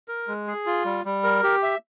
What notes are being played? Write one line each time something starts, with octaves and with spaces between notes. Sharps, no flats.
A#4
G#3
G#4
F4
G3
G3
A#4
G4
E5